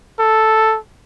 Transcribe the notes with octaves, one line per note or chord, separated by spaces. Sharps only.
A4